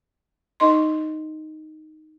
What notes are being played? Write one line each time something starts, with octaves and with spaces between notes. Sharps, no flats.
D#4 D#5 C6